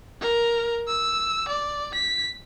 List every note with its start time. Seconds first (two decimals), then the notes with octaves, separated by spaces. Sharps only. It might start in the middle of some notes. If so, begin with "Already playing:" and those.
0.21 A#4
0.88 E6
1.48 D5
1.94 B6